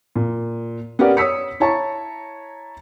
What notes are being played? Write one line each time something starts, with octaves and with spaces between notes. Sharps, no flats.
A#2
B3 C#4 G4 A#4 D5 F#5
C#5 D#6 E6 B6 C#7
E4 C#5 A5 A#5 C#6